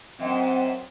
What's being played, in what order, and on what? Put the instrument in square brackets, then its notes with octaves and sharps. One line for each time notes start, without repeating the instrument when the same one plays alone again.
[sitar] F#2 [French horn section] C4 D#5 [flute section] F#5 G5 C6